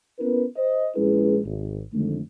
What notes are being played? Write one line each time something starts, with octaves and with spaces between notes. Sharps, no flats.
B3 C#4 E4 A#4 B4
C5 D#5
A#1 G#3 C#4 E4 G#4 B4
G#1
F2 D3 D#3 G#3 A3